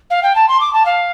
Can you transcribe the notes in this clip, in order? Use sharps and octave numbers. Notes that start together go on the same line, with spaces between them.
F5
G5
A5
C6
D6
A5
F5